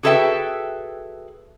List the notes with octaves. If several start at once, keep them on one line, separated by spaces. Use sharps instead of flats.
F#4 G#4 A4 B4 E5 G5